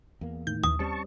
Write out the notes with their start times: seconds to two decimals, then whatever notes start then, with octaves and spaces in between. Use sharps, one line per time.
0.21 E2 A#3
0.47 A2 D#3 G6
0.64 A#1 D#2 E3 D#6
0.79 G3 C4 C#4 A5 C#6